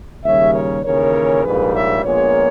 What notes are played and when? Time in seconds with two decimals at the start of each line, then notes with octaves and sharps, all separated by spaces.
0.24 D#2 C#3 G3 C#5 E5
0.53 A#4 C#5
0.83 D#2 C#3 E3 A#4 C#5
1.43 A#1 G#2 G3 A#3 G#4 B4
1.73 C#5 E5
2.02 A#1 A#2 G#3 B3 A#4 C#5